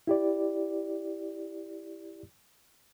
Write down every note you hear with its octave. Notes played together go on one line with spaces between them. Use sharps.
E4 G4 D5